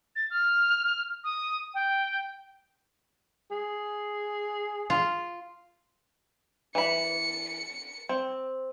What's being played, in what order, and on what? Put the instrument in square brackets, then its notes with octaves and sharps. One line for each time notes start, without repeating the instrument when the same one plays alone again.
[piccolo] A6
F6
D#6
G5
[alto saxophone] G#4
[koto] F4
[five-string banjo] E3 B5 [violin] C#7
[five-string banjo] C4